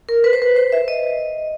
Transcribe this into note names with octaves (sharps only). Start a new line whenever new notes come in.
A#4
B4
C5
B4
C5
E5
D#5